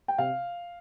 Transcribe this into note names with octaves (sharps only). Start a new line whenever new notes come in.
G5
C3 F5